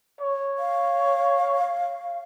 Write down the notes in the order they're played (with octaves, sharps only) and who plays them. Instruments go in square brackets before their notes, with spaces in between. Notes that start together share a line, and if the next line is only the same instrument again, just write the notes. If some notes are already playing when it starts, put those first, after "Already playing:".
[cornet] C#5
[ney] F5